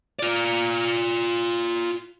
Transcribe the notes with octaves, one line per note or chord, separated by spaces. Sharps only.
F4 D5